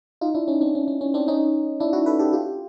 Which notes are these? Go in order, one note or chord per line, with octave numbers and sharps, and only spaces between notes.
D#4 F4
D4 E4
C#4 D#4
C4 D4
C#4
C#4
C#4
C4 D4
C#4 D#4
D4 E4
E4 F#4
A4 B4
G4 A4
F4 G4